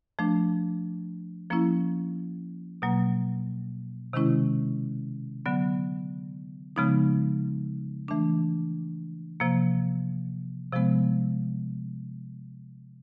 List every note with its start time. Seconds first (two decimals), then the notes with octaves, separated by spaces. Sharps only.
0.19 F3 A3 D4
1.51 F3 A#3 C#4 E4
2.82 B2 F#3 A#3
4.13 C3 D#3 G#3 C#4 E4
5.46 D3 F#3 B3
6.76 C#3 F3 G#3 B3 D#4
8.08 E3 A3 D4
9.40 C3 F3 A#3
10.73 C3 F3 G#3 B3